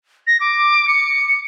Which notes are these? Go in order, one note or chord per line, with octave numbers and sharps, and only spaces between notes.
A#6
D6
C#7